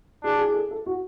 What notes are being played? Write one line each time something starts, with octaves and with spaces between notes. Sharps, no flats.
D4 G#4
G#4
G#4
A4
A4
F#4